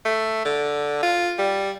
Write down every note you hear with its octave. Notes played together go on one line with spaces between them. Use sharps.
A3
D3
F4
G3